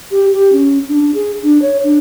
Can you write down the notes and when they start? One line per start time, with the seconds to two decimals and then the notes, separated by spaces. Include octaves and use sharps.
0.11 G4
0.33 G4
0.53 C#4
0.89 D4
1.14 G#4
1.43 D4
1.62 C#5
1.84 D4